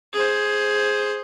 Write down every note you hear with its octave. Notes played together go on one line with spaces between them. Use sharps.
G#4 C5